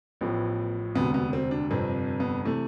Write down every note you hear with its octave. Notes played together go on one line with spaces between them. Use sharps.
A1 A2 F3 B3
E1 D2 C3 B3
B3
C4
D4
G1 F2 C3 C4
B3
C3 E3 A3